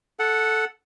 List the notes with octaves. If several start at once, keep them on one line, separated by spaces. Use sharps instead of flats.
A4 F#5